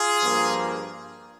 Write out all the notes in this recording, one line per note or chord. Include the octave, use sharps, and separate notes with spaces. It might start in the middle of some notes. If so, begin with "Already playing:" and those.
Already playing: F4 G#4
G2 F3 A#3